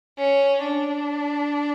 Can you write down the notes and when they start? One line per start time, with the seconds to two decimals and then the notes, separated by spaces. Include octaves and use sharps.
0.18 C#4
0.64 D4